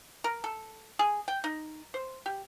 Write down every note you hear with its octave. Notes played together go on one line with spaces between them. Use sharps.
A#4
A4
G#4
G5
D#4
C5
G4